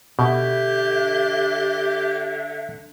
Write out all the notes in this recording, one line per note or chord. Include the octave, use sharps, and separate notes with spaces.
B2 D3 G4 E5